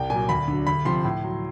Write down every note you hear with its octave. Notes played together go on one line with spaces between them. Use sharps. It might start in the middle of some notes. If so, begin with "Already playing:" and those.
Already playing: C2 G5
A#2 F#3 G#5
D2 B5
D3 F#3
D2 B5
C3 F3 C6
A2
F#3